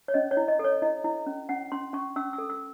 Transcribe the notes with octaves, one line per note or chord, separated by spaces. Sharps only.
C#5
C#4 D#5
C#5
E4
D#5
A4
C#5
E4 D#5
E4
C#4
C#4 F#5
C#4 C6
C#4 C#6
C#4 E6
E6
A4
E6